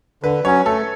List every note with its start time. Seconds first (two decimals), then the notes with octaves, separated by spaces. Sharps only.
0.23 D3 B4
0.45 F#3 C#4 C#5
0.65 A3 A4